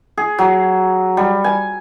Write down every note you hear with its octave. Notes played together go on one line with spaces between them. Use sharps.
G#4
F#3
G3
G#5